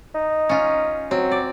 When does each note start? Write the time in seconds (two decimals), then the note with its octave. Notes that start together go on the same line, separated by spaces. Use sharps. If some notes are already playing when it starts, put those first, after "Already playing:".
0.15 D#4
0.49 C#4 F4
1.11 F#3 C4
1.31 D5